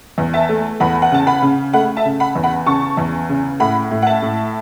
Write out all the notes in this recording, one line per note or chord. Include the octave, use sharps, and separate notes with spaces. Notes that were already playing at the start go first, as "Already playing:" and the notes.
E2
E5 A5
A3
E2 F#5 B5
F#5
C#3 A5
F#5 B5
C#3
A3 F#5 B5
E5 A5
C#3
F#5 B5
E2
F#5 B5
C#3 A5 C#6
E2
C#3
A2 F#5 B5
A2
F#5
E5 A5
A2